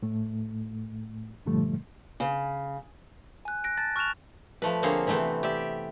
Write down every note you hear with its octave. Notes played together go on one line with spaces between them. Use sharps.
A2 A3
G2 A#2 D3 F3 G3 A3
C#3
G#5 F#6
F#6 A#6 D7
A5 A6
C#6 F6 F#6 E7 F7
F3 A3 B4
D3 A#3 C4 G#4 C5 C#5
C3 E3 A3 B3 C4
G4 D5 E5